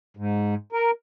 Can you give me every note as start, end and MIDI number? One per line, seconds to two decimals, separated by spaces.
0.17 0.54 44
0.72 0.91 70